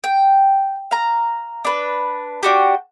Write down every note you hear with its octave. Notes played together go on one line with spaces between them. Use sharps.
G5
F5 A#5
D4 B4
D4 F#4 G4